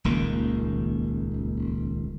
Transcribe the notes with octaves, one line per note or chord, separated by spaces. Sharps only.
D#1 C#2 D#3 A#3